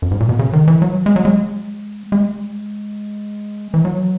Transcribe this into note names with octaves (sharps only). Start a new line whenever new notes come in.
F#2
G#2
A#2
B2
C#3
D#3
E3
F#3
G#3
F#3
G#3
G#3
E3
F#3